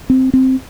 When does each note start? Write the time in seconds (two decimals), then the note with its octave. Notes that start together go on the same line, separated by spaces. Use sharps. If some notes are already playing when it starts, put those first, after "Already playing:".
0.10 C4
0.34 C4